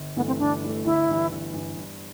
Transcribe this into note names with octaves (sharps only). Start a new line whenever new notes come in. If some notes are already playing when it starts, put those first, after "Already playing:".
Already playing: G1
G2 E3 A3 B3
C4
G1 D4
G2 E3 A3
G1 E4
G2 E3
G1
G2 E3
G2